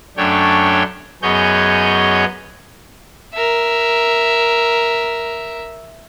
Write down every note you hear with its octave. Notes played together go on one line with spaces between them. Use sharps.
F#2 A3 D4 C#5 G5
F#2 B3 G#4 C#5 D#5 G6
A#4 E5